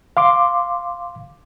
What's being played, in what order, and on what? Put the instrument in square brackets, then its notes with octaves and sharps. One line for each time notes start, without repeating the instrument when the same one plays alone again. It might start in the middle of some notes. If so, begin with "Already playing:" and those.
[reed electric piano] F5 C6 D6